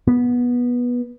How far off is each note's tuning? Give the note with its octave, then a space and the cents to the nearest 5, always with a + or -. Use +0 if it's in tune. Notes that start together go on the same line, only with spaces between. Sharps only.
B3 -15